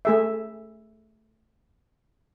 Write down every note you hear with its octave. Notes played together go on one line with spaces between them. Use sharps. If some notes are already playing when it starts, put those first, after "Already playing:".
A3 G#4 E5